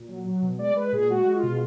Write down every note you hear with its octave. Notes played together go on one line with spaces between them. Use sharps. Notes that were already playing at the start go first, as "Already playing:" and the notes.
Already playing: A#2
F#3
F#3
B2
G#3 D5
G#3 B4
A#2 G#4
G#3 F#4
G#3
F4
B2